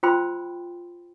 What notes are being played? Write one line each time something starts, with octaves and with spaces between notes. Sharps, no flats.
F4 C5 G5 B5 C6 E6